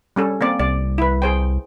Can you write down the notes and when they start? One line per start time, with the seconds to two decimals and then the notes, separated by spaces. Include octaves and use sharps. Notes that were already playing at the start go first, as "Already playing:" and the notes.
0.16 G3 C#4 A4
0.41 A#3 C4 D5
0.59 C2 D5
0.98 E4 B4
1.22 G#4 C5 G5